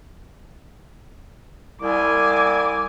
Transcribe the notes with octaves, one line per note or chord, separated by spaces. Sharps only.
C2 G#5 D6